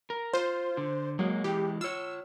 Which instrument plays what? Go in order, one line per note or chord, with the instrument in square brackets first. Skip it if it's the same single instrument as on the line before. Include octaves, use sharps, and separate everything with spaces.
[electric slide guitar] A#4
[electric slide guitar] F4 [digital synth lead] C5
[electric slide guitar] D3
[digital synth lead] F#3 [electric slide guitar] G#3 A#3
[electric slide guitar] E3 G#3 [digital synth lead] G4
[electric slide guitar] F4 C#5 [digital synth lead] E6